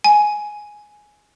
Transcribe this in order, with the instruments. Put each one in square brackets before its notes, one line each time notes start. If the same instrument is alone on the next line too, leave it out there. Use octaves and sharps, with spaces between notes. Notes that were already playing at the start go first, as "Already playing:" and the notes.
[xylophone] G#5